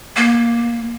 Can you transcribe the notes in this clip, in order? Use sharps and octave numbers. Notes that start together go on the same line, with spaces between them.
A#3